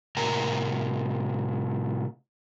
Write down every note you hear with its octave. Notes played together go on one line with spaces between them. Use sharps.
A2 C3 A#4 G#5 A#5